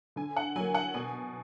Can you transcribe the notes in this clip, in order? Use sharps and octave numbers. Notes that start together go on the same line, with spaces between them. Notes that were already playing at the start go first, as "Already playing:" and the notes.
D3 G#5
F#5
F#3 A#3 G#5
F#5
B2 G#5